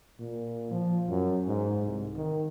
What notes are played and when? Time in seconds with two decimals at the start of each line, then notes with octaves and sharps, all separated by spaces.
0.19 A#2
0.71 F3
1.09 F#2
1.47 G#2
1.86 C2
2.16 D#3